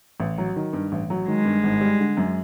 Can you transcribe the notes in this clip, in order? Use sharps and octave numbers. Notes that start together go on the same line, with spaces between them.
A1
F#3
D#3
G2
A1
F#3
D#3 G#3
G2
G#1
G3
D3
F#2